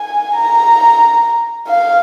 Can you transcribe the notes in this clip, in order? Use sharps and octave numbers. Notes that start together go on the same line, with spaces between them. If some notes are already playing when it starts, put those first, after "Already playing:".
Already playing: G#5
A#5
F5